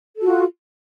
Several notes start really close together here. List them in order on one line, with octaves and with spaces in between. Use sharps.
A4 F#4 F4